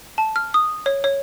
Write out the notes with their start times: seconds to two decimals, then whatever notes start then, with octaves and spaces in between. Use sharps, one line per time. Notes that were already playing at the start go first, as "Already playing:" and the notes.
0.18 A5
0.36 F6
0.54 D#6
0.86 C#5
1.04 C#5